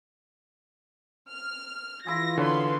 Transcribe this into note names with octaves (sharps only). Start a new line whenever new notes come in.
F6
E3 E4 F4 G#4 A#6
D3 B3 C#4 B4 C6